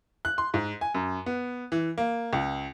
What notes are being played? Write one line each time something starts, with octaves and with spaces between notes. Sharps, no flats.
F#6
C6
G#2
G#5
F#2
B3
E3
A#3
C#2